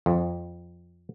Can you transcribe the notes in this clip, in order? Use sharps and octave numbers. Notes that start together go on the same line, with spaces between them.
F2